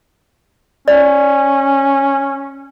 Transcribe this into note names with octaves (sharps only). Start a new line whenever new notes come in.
C#4 D5